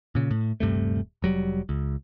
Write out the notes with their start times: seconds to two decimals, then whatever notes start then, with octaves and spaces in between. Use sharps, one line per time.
0.15 A#2 C#3
0.31 A2
0.60 D#1 G2 C3 A3
1.22 F1 F#3 G3
1.69 C#2